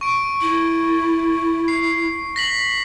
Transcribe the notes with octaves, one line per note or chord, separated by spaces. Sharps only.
C#6 D7
E4
C7
A#6 B6 F#7